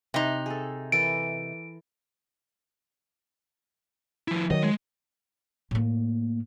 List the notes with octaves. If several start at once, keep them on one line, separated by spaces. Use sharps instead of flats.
C3 D#4
G#4 A4
E3 A4 A#4 D7
F3 E4
D#3 E3 F#3 D#5
G#3
A2 A#3